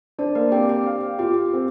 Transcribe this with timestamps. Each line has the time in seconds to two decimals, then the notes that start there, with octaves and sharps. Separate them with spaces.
0.18 D4 C5 D5
0.35 A#3 A#4
0.52 C4 G4 G5
0.69 G4 G5
0.86 F5
1.19 F4 G4 G5
1.53 C4